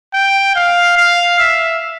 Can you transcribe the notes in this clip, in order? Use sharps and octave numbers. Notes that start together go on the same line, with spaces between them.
G5
F5
F5
E5